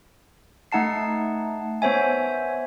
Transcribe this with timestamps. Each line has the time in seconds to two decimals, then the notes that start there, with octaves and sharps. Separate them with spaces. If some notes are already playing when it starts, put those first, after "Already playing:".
0.72 A3 D#4 F#5 A5 C7
1.82 B3 C5 C#5 E5 G#5